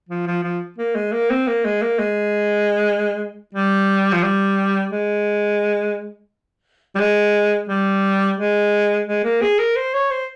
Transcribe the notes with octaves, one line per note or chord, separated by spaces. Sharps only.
F3
F3
F3
A#3
G#3
A#3
C4
A#3
G#3
A#3
G#3
G3
F3
G3
G#3
G3
G#3
G3
G#3
G#3
A#3
G#4
A#4
C5
C#5
C5